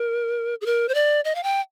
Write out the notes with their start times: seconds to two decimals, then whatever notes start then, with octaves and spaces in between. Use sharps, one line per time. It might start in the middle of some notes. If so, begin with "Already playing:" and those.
Already playing: A#4
0.61 G#4
0.66 A#4
0.89 C5
0.94 D5
1.25 D#5
1.35 F5
1.43 G5